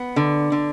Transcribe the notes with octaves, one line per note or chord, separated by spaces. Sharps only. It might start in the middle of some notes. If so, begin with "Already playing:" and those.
Already playing: B3
D3
D3